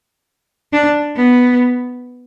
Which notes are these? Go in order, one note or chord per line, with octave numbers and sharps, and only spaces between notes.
D4
B3